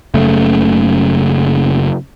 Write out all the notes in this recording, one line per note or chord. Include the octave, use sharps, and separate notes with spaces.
F#1 C#3 A3